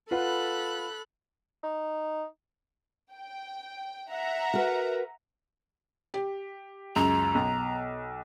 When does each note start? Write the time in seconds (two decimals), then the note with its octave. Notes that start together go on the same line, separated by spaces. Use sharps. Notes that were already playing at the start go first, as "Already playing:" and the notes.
0.11 F4 A4 B4 F#5 B5 F#6
1.64 D#4
3.12 G5
4.11 E5 F#5 A#5
4.54 F#4 A#4 B4
6.14 G4
6.96 C#2 F#2 A#5
7.35 B1